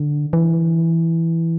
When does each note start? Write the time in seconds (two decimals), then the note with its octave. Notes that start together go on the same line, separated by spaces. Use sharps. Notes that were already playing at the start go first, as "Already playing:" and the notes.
Already playing: D3
0.33 E3